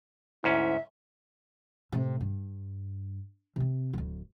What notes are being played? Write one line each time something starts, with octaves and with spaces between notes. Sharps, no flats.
D2 G#2 C#4 E4 E5
A2 C3
G2
C3 C4
D1 D2